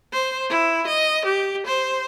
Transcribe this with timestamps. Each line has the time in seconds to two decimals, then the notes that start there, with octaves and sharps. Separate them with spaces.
0.12 C5
0.50 E4
0.87 D#5
1.25 G4
1.66 C5